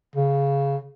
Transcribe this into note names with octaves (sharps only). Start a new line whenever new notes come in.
C#3